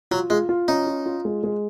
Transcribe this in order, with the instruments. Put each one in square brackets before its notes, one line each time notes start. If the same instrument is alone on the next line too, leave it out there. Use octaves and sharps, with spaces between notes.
[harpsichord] F#3 [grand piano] F4
[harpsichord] G#3 [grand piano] F4
[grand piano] F4
[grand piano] C#4 [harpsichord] D#4
[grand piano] F4
F4
G#3
G#3